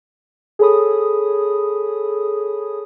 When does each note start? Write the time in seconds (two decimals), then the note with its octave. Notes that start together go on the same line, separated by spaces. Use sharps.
0.59 G#4 A4 C#5 B5 D#6